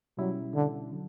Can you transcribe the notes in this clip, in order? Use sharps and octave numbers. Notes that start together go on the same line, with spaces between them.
B2 F#3 G3 C#4 E4
D3
D3 F#3